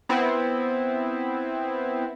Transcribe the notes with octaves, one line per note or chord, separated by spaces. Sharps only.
B3 C4 E4